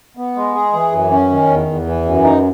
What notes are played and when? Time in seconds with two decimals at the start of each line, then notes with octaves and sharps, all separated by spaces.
0.17 B3
0.36 G#3
0.55 G#4
0.73 E3
0.92 F#2
1.11 C#4
1.30 D#3
1.49 E2
1.67 E2
1.86 E3
2.05 F#2
2.24 D#4